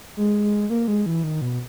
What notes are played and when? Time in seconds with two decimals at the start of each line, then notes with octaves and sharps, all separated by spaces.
0.17 G#3
0.70 A#3
0.88 G#3
1.06 E3
1.24 D#3
1.41 B2